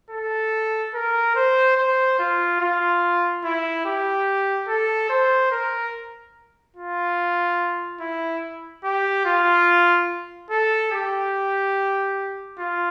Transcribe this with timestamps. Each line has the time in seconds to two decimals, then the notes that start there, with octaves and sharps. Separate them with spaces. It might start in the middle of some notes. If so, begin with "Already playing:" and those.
0.10 A4
0.94 A#4
1.36 C5
1.77 C5
2.19 F4
2.60 F4
3.44 E4
3.85 G4
4.68 A4
5.09 C5
5.51 A#4
6.76 F4
8.00 E4
8.84 G4
9.25 F4
10.50 A4
10.92 G4
12.58 F4